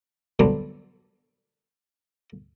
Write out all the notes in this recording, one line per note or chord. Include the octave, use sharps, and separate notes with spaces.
D3 F#3 G3 B3 C4